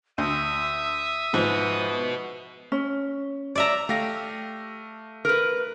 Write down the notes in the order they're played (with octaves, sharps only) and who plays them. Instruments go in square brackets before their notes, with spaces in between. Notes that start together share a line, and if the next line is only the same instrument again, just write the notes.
[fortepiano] D2 [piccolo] E5 [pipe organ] D#6
[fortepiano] G#2 F3 [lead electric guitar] F#4 B4
[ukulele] C#4
[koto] D5 E5 A#5
[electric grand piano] A3 F5 A#6 [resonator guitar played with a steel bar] G4
[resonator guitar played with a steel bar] A#4 B4